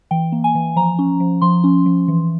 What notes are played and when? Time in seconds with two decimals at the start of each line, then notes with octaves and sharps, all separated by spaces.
0.11 E3 G5
0.32 A#3
0.44 G#5
0.55 E3
0.76 F3 A#5
0.99 C#4
1.20 F3
1.42 F3 C6
1.64 C#4
1.86 F3
2.08 E3